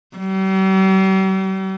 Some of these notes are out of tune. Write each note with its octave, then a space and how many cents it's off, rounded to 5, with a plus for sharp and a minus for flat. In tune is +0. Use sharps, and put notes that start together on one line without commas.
G3 -45